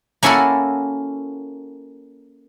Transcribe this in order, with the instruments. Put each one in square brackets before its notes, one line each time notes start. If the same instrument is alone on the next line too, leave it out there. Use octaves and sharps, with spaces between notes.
[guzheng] A#3 C#4 E4 F#4 A4 A#4